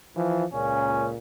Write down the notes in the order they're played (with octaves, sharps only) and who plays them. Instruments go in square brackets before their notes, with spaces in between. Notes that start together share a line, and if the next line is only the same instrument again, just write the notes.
[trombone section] E3 F3
[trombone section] C#2 A#2 [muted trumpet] C#4